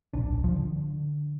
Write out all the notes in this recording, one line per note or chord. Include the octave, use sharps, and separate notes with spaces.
D1 A#1 D4
F3
D3